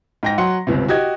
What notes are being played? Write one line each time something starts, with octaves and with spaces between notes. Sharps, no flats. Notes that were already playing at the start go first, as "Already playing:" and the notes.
G#2 G5 A#6
F#3 F#5 C6
G1 C#2 C3
F#4 G4 D#5 G#6